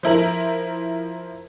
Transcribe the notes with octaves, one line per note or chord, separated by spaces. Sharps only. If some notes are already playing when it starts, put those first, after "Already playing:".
F3 E4 A#4 F#7